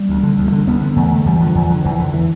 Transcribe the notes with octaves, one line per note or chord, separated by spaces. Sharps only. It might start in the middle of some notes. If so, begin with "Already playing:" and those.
Already playing: G3
D2
D3
D2
D3
D2 B3
D3
E2 A3
D3
E2 G3
D3 F3
E2
D3
E2 E3
D3 E3
E3